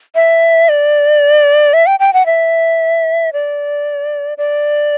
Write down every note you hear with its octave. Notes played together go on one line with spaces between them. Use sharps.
E5
D5
E5
G5
G5
F#5
E5
D5
D5